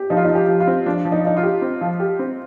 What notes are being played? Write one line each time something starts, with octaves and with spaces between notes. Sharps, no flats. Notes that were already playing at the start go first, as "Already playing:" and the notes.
Already playing: G4
F3 D#4
F4
D#4
F3
G4
F3
F4
C4
F3 D4
F3
D#4
F3 D#4
F4
G4
C4
F3
G4
C4